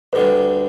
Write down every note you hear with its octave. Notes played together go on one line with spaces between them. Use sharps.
D2 D3 G3 B4